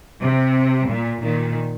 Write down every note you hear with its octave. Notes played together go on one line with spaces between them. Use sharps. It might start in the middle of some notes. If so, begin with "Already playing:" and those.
C3
A#2
A#2 D#3